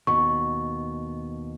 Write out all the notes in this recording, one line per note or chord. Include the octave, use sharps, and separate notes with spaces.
D#2 B2 C#6